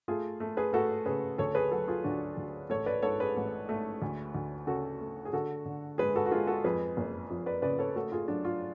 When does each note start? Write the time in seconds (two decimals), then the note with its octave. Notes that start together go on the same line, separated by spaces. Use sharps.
0.08 A3 F4 G#4
0.40 A3
0.57 G#4 B4
0.73 A3 F#4 A4
1.06 C#3 G#4 B4
1.38 D2 A4 C#5
1.55 G#4 B4
1.71 F#3 F#4 A4
1.88 F4 G#4
2.04 D2 D4 F#4
2.37 D2
2.70 A1 A4 C#5
2.86 B4 D5
3.03 G#2 A4 C#5
3.20 G#4 B4
3.37 A1
3.69 A3
4.02 D2
4.35 D2
4.67 C#3 F#4 A4
5.01 A3
5.25 G#4
5.33 D3 F#4 A4
5.66 D3
5.98 G#3 G#4 B4
6.16 F#4 A4
6.26 F#4
6.31 G#3 F4 G#4
6.47 F#4 A4
6.64 F2 G#4 B4
6.97 F#1
7.30 F2
7.46 B4 D5
7.62 C#3 B4 D5
7.79 A4 C#5
7.95 A3 F#4 A4
8.12 F4 G#4
8.28 F#3 D4
8.45 F4